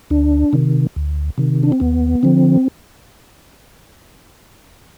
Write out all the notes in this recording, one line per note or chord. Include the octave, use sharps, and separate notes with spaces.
D2 D4
C3 D#3
D2
C3 D#3
D4
C4
D#2 B3
D3 F3 C4